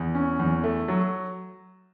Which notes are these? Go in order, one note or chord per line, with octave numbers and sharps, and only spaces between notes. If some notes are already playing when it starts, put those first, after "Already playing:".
Already playing: E2
C#4
E2
A3
F#3